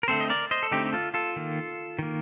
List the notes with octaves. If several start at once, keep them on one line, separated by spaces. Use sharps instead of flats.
A#4
D3 A3 C4 A4 C5
D#5
A#4 D5
C5 D#5
A4
D3 A3 C4 D#4 G4
G4
F4 A4
F4 A4
D#3 A#3
D#3 A#3